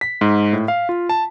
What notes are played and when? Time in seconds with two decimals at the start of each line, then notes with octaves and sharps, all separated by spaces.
0.01 B6
0.21 G#2
0.53 A2
0.68 F5
0.89 F4
1.09 A5